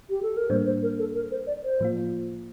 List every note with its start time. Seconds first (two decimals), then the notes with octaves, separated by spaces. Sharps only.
0.10 G4
0.22 A4
0.37 A#4
0.50 A2 G3 A#3 D4 C5
0.66 C5
0.82 A#4
0.99 A4
1.15 A#4
1.31 C5
1.47 D5
1.64 C5
1.80 A2 F3 A#3 F4